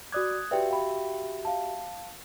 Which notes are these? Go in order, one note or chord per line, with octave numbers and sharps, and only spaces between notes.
F#4 D5 D6 D#6 F#6 G#6
F#4 G4 B4 D5 E5 G5
F5 G5 B5
F5 A5